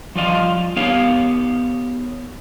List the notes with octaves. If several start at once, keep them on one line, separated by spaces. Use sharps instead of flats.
F3 G3 F4 D5 D#5 F5
B3 D#4 G4 A#4 C#5 F5